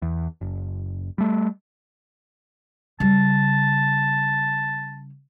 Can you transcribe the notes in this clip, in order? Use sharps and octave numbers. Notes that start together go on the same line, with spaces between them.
E2
F#1
G3 A3
C#3 G3 A5